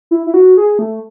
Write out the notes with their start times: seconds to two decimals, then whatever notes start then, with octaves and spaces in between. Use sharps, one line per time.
0.11 E4
0.27 E4
0.34 F#4
0.57 G#4
0.79 A3